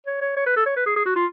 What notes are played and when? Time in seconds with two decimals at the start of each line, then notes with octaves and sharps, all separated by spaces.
0.07 C#5
0.22 C#5
0.37 C#5
0.46 B4
0.56 A4
0.66 C#5
0.77 B4
0.86 G#4
0.96 G#4
1.06 F#4
1.16 F4